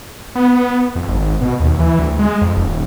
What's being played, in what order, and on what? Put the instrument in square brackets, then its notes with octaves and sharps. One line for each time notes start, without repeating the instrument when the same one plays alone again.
[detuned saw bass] B3
B3
F2
G#1
B2
D#2
E3
D2
G#3
F2
D#1